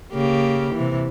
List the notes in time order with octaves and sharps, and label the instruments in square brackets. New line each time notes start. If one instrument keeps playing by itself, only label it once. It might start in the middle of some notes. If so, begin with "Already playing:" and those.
[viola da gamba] C#3 A#3 G4
C3 E3